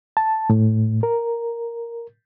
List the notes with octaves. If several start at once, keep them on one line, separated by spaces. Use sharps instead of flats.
A5
A2
A#4